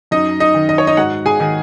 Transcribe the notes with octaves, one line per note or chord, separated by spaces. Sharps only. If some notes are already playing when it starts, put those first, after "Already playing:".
F#2 D#4 D#5
D#4 D#5
D#3
D#5
C#5
D#4 D#5
G#2 F#4 F#5
G#4 G#5
D#3